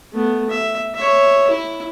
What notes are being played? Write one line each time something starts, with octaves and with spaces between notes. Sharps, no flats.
A3 B3
E5
C#5 E5
E4